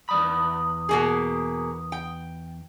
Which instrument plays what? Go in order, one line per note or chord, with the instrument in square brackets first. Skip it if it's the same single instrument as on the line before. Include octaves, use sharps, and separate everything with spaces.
[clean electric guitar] E2 D5 B5 [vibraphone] D#6
[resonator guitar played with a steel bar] B2 A#3 G#4
G5